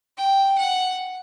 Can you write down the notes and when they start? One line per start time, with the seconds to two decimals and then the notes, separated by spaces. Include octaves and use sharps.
0.18 G5
0.58 F#5